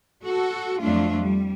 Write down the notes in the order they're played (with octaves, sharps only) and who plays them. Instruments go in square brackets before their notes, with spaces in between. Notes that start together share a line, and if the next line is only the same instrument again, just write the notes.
[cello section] F#4 A4
F2 F#3 A3 D4 F4
G3